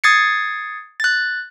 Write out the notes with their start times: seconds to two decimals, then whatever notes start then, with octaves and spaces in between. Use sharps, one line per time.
0.04 D#6 G#6 A6 C7 C#7
1.00 F#6 A6